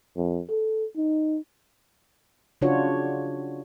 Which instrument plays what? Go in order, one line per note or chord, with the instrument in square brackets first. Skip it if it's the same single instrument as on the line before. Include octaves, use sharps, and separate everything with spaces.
[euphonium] F2
A4
D#4
[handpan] C#3 D4 F4 F#4 C#5